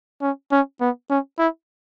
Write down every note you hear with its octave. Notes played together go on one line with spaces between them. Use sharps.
C#4
C#4
B3
C#4
E4